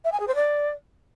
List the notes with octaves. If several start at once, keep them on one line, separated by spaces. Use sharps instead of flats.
E5
G#5
G#4
C5
D5